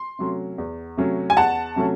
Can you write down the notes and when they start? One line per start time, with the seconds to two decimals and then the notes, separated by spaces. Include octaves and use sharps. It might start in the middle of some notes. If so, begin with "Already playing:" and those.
Already playing: C6
0.19 C3 F#3 A3 C#4
0.58 E2
0.97 C3 F#3 A3 C#4
1.30 G#5
1.37 E2 F#5 A5
1.76 C3 F#3 A3 C#4